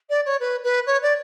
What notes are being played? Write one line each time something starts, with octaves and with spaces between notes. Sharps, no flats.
D5
C#5
B4
B4
C#5
D5